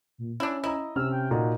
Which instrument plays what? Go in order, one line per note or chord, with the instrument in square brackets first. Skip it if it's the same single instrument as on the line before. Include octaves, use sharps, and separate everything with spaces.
[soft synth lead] A#2
[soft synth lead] C#4 [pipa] D4 E4
[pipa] E4 [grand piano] D#5 A#5
[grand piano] C3 C#4 F6 [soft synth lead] E6
[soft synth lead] G5
[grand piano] A#2 D#4 [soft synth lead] F#4